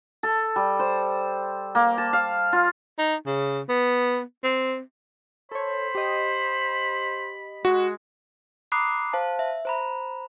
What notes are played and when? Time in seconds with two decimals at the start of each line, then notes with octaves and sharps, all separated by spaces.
0.23 A4
0.56 G3
0.79 C5
1.75 A#3
1.98 A5
2.13 F5
2.53 F4
2.98 D#4
3.26 C#3
3.69 B3
4.43 C4
5.52 A4 C5 C#5 B5
5.95 G4 D#5
7.65 G#3 F#4
8.72 A#5 B5 D6 D#6 F#6 C7
9.13 C5 F5 A5
9.39 E5
9.65 C5 A#5 B5